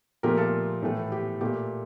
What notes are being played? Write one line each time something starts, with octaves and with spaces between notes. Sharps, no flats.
A#2 F3 A3 G4 A#4
F4 A4
A2 E3 A3
G4
A#2 A3 G4